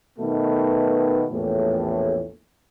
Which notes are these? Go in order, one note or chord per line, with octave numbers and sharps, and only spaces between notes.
B2 D#3 A3 B3
A#1 E2 A2